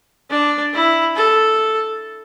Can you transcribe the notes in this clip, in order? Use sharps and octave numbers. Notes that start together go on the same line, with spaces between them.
D4
E4
A4